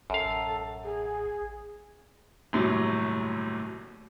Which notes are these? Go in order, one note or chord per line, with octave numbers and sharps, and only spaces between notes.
A1 F#2 A4 F5
G#4
G1 D#2 A2 C3 F#3